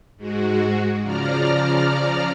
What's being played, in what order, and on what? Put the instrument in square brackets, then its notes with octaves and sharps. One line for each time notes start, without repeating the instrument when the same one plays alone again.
[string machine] G#2 G#3 F#4
C#3 F3 D5 A#5 F6